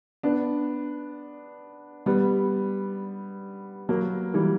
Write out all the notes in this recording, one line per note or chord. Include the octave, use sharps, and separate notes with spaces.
B3 D4
G3 B3
F#3 A#3
E3 G3